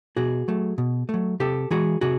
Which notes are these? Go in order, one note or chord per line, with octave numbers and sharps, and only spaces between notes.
B2 F#4 G#4
F#3 A3
B2
F#3 A3
C3 G4 A4
E3 G#3 F#4 G#4
C3 F#4 G#4